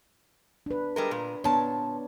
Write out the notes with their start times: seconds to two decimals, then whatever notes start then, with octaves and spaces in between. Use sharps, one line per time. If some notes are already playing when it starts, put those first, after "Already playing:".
0.66 D4 B4
0.96 G3 G#3 A#4
1.11 A#2
1.44 A#2 B3 D4 C#5 A5